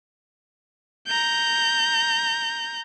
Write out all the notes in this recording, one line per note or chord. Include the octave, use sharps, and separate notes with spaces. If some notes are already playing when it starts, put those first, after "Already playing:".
A#5 G6